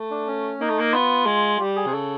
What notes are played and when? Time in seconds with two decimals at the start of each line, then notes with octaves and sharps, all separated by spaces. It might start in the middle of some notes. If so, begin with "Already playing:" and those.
Already playing: A3
0.11 D4
0.27 C#4
0.60 A#3 D#4
0.69 A3
0.79 A#3
0.93 B3 F4
1.26 G#3
1.60 G3 G4
1.76 G#4
1.86 C3
1.93 C#3 A4